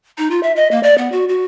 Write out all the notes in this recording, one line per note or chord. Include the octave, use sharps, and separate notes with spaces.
D#4
F4
E5
D#5
A#3
D5
B3
F#4
F#4